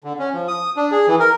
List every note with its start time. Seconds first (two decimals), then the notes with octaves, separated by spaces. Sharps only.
0.04 D3
0.19 C#4
0.34 F3
0.48 D#6
0.77 D4
0.92 G#4
1.08 E3
1.20 A#4